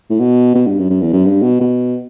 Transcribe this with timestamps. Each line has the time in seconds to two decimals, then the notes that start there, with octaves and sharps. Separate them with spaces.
0.10 A2
0.20 B2
0.55 B2
0.67 G2
0.79 F#2
0.90 F#2
1.01 E2
1.13 F#2
1.25 G2
1.42 B2
1.60 B2